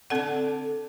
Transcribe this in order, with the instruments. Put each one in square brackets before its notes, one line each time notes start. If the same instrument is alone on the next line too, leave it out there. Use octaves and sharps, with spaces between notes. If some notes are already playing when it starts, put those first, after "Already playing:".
[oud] D3 D4 [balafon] C4 A4 F#5